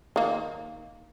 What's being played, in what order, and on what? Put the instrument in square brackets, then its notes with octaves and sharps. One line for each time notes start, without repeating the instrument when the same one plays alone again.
[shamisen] D#3 A#3